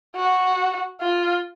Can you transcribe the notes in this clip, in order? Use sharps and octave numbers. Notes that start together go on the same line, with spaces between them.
F#4
F4